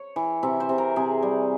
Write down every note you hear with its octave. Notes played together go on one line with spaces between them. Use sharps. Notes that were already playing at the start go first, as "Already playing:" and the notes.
Already playing: C#5
E3
C3 E5
C5
C3
A#4
C3 G#4
G3